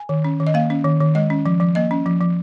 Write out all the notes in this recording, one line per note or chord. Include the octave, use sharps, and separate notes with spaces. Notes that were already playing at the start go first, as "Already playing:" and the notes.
Already playing: G#5
D#3
C#4
D#3
D#5
A#3 F5
C#4
D#3
D#3
G#3 D#5
C#4
F3
F3
A#3 D#5
C#4
F3
F3